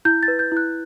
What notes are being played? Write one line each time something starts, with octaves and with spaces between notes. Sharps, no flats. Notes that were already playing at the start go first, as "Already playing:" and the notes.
E4 G6
A6
B4
G6
E4 F#6